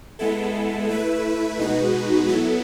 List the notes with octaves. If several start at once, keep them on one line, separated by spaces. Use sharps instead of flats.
G#3 B3 E4 A4
A3 E4 B4 E5
B2 G#3 D#4 F#4 B4
F#3 B3 E4 A4